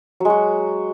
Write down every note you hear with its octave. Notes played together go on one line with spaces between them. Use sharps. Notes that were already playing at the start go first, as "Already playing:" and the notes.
F#3 G#3 F#4